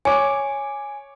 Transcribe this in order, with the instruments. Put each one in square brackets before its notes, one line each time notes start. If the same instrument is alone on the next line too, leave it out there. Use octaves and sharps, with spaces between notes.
[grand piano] C#5 D6 [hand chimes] G#5